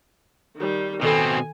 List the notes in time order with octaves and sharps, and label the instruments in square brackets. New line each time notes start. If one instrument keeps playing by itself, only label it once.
[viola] D#3 G3
[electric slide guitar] B2 C4 [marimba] D#3 A4 B5 [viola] G#5